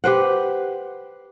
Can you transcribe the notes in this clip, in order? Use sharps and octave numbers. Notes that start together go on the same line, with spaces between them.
G4 B4 C5 F#5